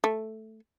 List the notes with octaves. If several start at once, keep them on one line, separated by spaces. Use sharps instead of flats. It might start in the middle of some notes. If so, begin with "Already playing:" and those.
A3